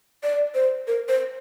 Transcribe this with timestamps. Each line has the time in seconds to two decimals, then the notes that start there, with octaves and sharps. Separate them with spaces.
0.23 D5
0.55 C5
0.87 A#4
1.08 C5